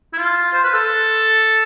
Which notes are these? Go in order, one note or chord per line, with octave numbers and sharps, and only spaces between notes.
E4
F4
C5
B4
A4